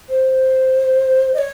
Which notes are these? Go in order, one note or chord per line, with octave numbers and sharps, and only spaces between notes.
C5
D#5
C#5